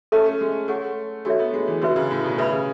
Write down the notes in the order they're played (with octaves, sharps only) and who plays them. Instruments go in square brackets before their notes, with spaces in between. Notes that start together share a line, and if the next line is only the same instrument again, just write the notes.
[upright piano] C#4 [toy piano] A4 E5 A5 C#6
[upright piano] A3
G#3
[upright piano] A3 [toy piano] G#4 C#5 F#5 C#6
[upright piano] A3 [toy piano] D4 F#4 A4 C#5 E5
[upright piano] B3
G#3
E3
[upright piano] D3 [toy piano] C#4 F#4 B4 E5
[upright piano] C#3
A2
B2
[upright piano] C#3 [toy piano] B4 E5 B5
[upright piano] C#3